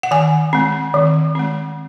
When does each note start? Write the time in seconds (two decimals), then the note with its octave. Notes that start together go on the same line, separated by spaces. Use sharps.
0.03 F#5
0.11 D#3 G#5
0.53 G#3 C4
0.94 D#3
1.35 G#3 C4